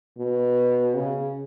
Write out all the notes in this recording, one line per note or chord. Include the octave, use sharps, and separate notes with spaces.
B2
C#3